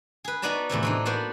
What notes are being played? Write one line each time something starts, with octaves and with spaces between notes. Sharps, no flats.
G#4 B4
B3 D#4 F#4 D5 D#5 A5
E2 A2 C3 E4
E3 D4 D#4
A#3 B3 F#4 C5 A5